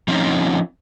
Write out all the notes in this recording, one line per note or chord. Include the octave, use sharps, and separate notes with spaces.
F3 C4 C#4 D#4